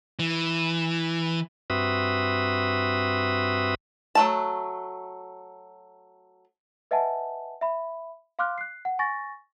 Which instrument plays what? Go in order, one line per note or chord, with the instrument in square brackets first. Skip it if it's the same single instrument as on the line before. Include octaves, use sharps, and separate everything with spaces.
[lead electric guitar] E3
[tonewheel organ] G2 C4 F#4 B4 E5 D#6
[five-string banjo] F#3 A3 A5
[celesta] B4 D#5 E5 F#5 G#5 A5
E5 B5
F5 C6 D6 F6 F#6
F#6 C7
F#5
G#5 C#6 A6 A#6